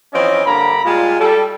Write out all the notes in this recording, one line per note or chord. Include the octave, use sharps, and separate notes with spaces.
E3 F3 C4 C#4 C#5 D#5
G2 D3 A#3 A#5 B5
A#2 G3 G#3 F4
G3 A4